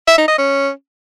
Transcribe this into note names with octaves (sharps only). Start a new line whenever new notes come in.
E5
D#4
D#5
C#4